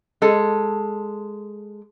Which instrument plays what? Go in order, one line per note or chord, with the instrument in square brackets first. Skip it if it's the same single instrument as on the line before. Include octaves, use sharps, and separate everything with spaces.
[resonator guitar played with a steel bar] G#3 A4